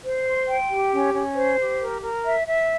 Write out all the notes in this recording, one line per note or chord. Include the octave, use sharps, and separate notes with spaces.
C5
C6
G5
G4
C#4
C#4
C5
G4
A#4
A#4
E5
E5